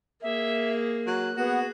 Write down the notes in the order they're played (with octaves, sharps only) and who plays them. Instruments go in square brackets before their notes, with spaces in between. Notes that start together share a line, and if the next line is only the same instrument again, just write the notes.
[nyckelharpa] A#3 G#4 [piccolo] E5
[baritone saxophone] F#3 [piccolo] F#6
[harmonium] B3 [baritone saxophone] F#4 [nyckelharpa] G#4